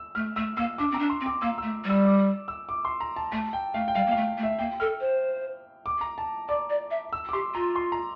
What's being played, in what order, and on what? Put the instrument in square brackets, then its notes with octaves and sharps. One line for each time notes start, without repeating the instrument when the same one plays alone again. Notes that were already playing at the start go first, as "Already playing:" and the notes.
Already playing: [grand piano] E6
[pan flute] A3 [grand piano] F6
[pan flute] A3 [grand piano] E6
[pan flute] A#3 [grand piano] E6
[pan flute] D4 [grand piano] D6
[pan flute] C4
[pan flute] D4 [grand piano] A#5
[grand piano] C6
[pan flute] C4
[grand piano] D6
[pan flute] A#3 [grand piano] E6
[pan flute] A3 [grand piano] E6
[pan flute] G3 [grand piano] E6
[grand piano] D6
E6
D6
C6
A#5
A5
[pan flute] A3 [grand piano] A5
[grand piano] G5
[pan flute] A3 [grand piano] F5
[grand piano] G5
[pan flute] G3 [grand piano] F5
[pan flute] A#3
[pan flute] A3 [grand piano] F5
[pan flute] A3
[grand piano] E5
[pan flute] A#3 [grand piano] G5
[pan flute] A4 [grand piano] F6
[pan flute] C5
[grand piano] D6
A#5
A5
[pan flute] D5 [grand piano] D6
[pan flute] D5
E5
[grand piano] E6
D6
[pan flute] G4 [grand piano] C6
[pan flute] F4 [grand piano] A#5
[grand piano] C6
A#5